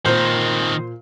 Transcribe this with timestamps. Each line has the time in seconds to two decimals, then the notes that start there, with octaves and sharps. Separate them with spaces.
0.06 A#2 D#3 C4 C5